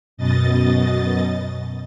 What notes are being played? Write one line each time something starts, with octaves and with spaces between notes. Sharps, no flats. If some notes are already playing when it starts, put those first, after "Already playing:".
F#2 B2 D#5 A6